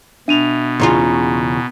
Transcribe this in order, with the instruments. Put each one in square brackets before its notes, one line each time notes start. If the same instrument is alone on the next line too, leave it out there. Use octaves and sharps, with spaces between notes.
[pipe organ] B2 [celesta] D4 D#7 F7 [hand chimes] E5
[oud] E2 C#3 F4 [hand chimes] G#5 A#5 C6